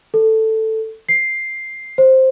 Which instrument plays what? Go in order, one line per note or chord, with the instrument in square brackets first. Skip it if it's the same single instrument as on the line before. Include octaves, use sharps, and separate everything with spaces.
[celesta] A4
C7
C5